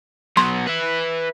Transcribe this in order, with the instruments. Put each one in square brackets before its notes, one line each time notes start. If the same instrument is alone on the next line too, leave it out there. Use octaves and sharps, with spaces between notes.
[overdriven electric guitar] F#3 B3 [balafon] C6
[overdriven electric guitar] B4 E5